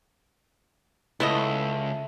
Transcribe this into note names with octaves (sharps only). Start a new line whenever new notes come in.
C#2 A3 B3 E4 D#5 E5